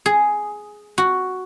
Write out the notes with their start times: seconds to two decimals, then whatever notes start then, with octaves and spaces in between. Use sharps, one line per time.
0.06 G#4
0.98 F#4